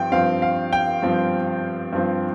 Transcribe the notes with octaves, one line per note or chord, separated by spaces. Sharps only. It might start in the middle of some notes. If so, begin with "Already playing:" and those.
Already playing: G2 F3 C4 G5
G2 F3 C4 F5
F5
G5
G2 F3 C4
G2 F3 C4